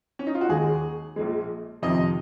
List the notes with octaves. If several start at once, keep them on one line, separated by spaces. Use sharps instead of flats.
C#4
D#4
F4
F#4
D#2 D#3 G#3 G#4
A#1 A#2 F3 G#3
F2 C3 D#3 D#5